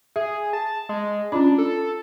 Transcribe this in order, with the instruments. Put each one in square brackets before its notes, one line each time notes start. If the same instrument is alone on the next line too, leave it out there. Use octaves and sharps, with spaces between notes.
[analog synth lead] G#4 [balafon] E5
[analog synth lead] A5
G#3
[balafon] C#4 F4 B5 [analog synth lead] D4
[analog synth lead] A4